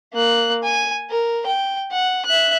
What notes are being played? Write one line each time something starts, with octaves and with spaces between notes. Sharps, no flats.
A#3 F#6
G#5
A#4
G5
F#5
E5 F#6